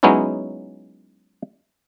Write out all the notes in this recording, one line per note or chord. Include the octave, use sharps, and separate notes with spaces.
F#3 G#3 B3 C#4 D#4 E4